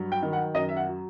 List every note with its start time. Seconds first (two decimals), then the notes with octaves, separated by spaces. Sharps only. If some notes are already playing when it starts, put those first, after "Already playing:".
Already playing: G2 F#3
0.12 G5
0.22 D#3
0.33 F#5
0.54 F#2 D#5
0.69 E5
0.76 F#5
0.87 F#3